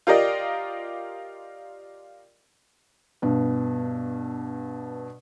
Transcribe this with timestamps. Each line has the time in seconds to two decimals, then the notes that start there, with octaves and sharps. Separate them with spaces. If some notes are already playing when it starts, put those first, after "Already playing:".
0.07 F4 G4 A#4 D5 D#5
3.22 G2 B2